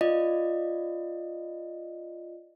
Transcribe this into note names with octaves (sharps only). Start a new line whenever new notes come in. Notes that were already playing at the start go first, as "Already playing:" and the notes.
F4 D5 D#5